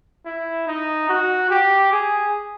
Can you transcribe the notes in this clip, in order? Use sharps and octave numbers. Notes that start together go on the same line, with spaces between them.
E4
D#4
F#4
G4
G#4